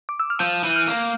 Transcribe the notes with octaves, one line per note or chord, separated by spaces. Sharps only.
D6
E6
F6
F3 G6
E3
F6
A#3